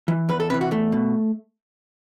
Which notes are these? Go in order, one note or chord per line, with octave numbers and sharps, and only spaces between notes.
E3
E2 B4
A4
C3 E3 B4
F#4
E2 A3
B2